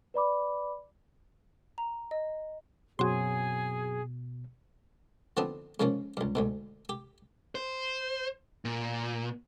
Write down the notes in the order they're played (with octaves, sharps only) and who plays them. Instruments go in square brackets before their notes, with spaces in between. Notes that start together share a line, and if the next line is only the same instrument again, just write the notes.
[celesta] B4 D5 B5 D6
[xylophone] A#5
D#5
[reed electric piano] F#2 F#3 C4 [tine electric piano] B2 [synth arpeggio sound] F#4 C6 [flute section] G#4
[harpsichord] D3 F3 B3 C4 D4 D#4
G#2 C#3 F3 A#3 C#4
C#2 G2
D2 G#2 B2
G4
[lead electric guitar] C5
A#2